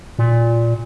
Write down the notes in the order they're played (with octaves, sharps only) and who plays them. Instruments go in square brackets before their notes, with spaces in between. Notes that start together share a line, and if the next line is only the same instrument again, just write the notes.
[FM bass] A#2